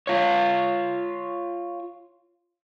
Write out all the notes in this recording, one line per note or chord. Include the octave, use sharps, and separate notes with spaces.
F4 C#5